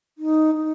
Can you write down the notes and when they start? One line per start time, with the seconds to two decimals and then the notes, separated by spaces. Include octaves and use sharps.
0.18 D#4
0.55 D#4